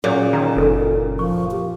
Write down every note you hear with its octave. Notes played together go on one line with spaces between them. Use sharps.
A#2 F#3 C#4 G#4 C#5
D#3 A#5
F#1 D#4 A4
F3 C#6
G4